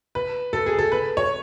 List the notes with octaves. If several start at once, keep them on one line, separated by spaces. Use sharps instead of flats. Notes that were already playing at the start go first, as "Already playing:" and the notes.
B4
A4
G#4
A4
B4
C#5